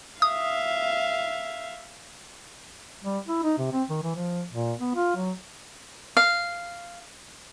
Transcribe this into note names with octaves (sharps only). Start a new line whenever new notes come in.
E5 F5 D#6
G3
E4
D#4
C3
C4
D#3
E3
F3
A#2
B3
F4
F#3
F5